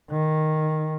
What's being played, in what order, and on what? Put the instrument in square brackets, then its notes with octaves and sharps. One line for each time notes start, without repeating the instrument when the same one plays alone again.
[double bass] D#3